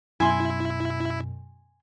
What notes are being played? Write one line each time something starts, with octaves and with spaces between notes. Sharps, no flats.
F#2 B2 E4 G#5 C6